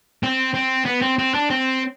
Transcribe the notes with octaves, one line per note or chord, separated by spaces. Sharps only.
C4
C4
B3
C4
C4
D4
C4